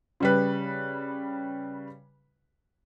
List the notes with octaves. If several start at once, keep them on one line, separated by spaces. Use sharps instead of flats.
C#3 G3 B4